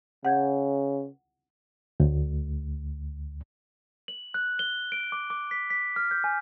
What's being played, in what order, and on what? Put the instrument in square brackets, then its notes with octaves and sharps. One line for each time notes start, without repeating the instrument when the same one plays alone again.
[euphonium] C#3 [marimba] F#5 G6 G#6
[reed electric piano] D2
[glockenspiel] F#7
F#6
G7
D7
D6
D6
B6
B6
F6
G6
G#5